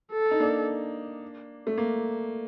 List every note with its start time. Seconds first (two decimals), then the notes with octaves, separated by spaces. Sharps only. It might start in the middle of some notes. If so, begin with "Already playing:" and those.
0.13 A4
0.31 D#4
0.40 A#3 D4
1.67 A3
1.78 A#3